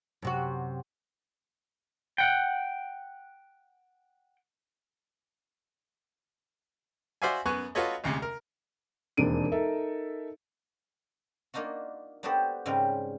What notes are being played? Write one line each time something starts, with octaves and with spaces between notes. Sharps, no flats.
F#2 C3 F#4
F#5 G5
F#4 C5 D5 E5 F5 G#5
F#2 B3 G#5 C#6 F#6
F4 F#4 A4 B4 C#5 D#5
A1 D2 C3 G#3
A#4
E1 D#2 C4 D4 D7 D#7
D#4 A4 A#4 E5
A#3 D4 D#4 F4 F#4
B3 D4 F#4 G4 A4 C5
G#2 C#3 G3 C4 F4 A#4